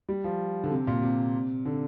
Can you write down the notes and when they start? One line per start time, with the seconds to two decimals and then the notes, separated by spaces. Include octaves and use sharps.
0.09 G3
0.24 F3
0.64 D3
0.71 C3
0.87 A#2
1.02 C3
1.65 D3